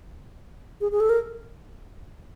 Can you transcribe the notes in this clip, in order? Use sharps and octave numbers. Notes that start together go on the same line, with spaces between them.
G#4
G#4
A4
A#4